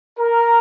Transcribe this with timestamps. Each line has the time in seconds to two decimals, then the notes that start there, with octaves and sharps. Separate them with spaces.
0.18 A#4